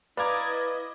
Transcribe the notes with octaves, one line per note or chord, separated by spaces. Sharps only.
E4 B4 D5 D#5 F5 A#5 D6 G#6